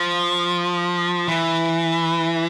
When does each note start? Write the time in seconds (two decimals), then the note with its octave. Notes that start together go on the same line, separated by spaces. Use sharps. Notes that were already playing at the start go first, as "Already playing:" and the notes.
Already playing: F3
1.28 E3